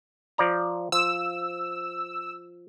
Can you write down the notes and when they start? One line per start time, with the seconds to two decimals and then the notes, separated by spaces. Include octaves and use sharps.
0.38 F3 D5 A#5
0.92 F3 E6